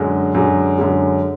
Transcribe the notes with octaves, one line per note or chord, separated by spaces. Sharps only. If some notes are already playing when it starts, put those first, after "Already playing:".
Already playing: F#2 D3 G#3
F#2 D3 G#3
F#2 D3 G#3